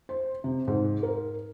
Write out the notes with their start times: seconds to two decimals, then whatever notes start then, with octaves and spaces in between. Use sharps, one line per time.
0.09 C5
0.44 C3
0.68 G#2
1.03 A#4